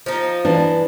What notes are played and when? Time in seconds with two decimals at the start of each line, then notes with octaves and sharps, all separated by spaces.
0.06 F3 D#4
0.45 E3 D4